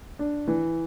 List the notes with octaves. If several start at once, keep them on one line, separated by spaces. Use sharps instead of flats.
D4
E3